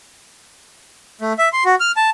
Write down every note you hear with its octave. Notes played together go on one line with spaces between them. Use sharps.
A3
E5
C6
F#4
F6
A5